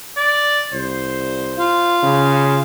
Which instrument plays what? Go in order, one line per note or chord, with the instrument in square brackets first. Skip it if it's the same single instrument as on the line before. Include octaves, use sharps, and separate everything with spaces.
[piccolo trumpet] D5
[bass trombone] C2 [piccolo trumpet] C5
[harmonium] F4 F5
[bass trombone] C#3